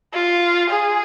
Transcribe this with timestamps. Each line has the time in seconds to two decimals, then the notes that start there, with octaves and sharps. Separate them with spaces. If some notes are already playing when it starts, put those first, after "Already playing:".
0.13 F4
0.70 G#4